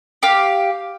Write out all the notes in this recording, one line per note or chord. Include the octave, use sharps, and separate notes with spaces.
G4 F5